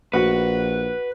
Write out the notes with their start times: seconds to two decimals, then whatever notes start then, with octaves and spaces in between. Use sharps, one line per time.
0.14 A#1 F#4 B4 F#5